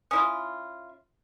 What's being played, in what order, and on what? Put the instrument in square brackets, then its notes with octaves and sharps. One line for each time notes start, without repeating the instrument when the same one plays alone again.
[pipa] C#4 E4 F4 [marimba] D#6